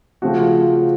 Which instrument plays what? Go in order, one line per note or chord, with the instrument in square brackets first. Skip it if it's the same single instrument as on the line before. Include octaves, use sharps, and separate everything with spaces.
[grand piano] C#3 F3 A3 C4 F#4